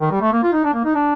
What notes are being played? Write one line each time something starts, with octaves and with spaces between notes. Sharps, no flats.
D#3
G3
A3
A#3
F4
D#4
D4
A#3
D#4
D4